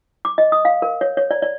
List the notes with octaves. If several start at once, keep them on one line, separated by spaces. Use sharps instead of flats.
D6
D#5
D#6
F5
A#4
C#5
C#5
D5
D5